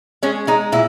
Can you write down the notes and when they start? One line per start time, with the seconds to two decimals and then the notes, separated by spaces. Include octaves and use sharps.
0.23 G#3 C#4
0.47 G#3 D#4
0.72 A#2 E4